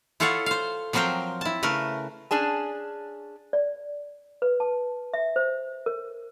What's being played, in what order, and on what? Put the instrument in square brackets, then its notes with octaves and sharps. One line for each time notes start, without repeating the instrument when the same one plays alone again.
[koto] E4 F4 A4 C#5 F5 F#5
C5 F5
F3 F#3 C4 A#4 C5 G5
E4 A5
C#3 A3 A#4 B4
[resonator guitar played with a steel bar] C#4 D4 G#4 A5
[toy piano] D5
B4
A5
E5
C5
A#4